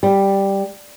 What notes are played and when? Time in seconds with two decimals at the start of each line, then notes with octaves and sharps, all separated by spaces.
0.03 G3